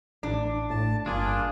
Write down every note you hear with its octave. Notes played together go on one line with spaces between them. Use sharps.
A1 D4
A2 A5
G1 A#3 D4 F4 G#4